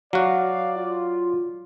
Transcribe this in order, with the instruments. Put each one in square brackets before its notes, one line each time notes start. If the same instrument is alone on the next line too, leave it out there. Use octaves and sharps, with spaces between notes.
[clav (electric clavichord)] F#3 F#4 [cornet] D5 [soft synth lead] F5
[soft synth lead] F4